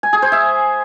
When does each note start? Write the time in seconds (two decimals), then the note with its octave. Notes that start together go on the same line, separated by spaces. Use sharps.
0.03 G#5
0.13 G#4
0.22 C5
0.32 E5